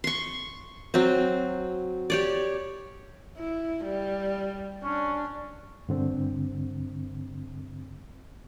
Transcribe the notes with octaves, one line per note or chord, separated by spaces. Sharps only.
C6 C#6
F#3 C4
G4 C#5 D5
E4
G3
C#4 D4
G2 D3 C4